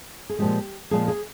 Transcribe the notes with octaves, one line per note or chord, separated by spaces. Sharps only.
G#4
A#2 F3 G#3 G4
A#2 F3 G#3 G#4
G#4